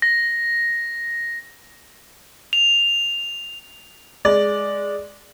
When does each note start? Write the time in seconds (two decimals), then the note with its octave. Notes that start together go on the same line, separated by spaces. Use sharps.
0.02 A#6
2.53 F7
4.25 G#3 D5